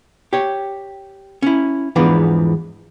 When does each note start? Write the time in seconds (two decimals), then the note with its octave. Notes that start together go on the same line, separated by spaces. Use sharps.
0.33 G4 C#5
1.42 C#4 E4
1.96 E2 G#2 E3 F3 B3 D4